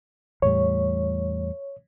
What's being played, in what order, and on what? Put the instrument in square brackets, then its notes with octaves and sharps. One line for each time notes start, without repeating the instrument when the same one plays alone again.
[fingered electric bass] E2 A2 G3 [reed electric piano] C#5